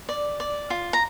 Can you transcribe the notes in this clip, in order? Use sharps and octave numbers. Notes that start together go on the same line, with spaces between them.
D5
D5
F4
A#5